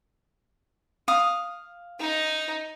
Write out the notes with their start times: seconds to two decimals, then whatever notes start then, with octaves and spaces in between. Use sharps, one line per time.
1.08 F5 D#6
1.99 D#4